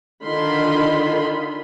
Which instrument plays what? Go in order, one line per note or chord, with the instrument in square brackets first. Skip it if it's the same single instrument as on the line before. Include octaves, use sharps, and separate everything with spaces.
[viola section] D3 D#3 F4 B5 C6